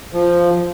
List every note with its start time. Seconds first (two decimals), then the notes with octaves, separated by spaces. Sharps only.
0.13 F3